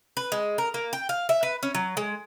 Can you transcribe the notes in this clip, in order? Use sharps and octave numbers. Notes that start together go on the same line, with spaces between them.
B4
G#3
A#4
A#3
G5
F5
E5
B4
C#4
F#3
G#3